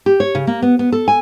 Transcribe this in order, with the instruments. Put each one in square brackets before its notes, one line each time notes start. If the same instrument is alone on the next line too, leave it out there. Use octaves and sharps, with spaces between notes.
[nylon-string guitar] G4
C#5
C#3
A#3
B3
B3
A4
G#5